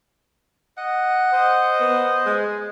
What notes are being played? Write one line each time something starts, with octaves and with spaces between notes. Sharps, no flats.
D#5 F#5
C5 D#5
B3
G#3